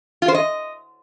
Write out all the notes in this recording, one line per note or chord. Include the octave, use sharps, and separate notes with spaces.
F4
C5
D#5